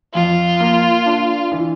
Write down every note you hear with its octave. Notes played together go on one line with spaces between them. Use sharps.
F2 F4
A#3
D4
E3